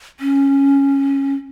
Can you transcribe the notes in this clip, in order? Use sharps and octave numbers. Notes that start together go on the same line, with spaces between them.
C#4